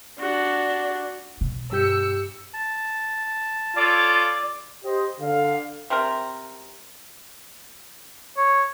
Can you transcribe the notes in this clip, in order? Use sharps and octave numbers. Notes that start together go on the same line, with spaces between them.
D4 F#4
B2
G2 G4 E6 G6 C#7
A5
F4 A4 C#5 D5 D6
G4 C5 D#5
D3 F5
C3 C4 A#4
C#5